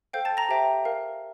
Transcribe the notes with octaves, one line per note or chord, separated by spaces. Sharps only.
A4 C5 F5 G5 G6
A5 A6
A#5 A#6
G4 C5 E5 G5
A#4 F5